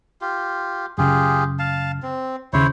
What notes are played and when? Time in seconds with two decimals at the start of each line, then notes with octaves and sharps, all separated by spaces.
0.21 F4 G4
0.98 F#2 C#3 F4 G4 G#4
1.59 F5 A5
2.03 C4
2.53 D#2 C#3 E4 C5 C#5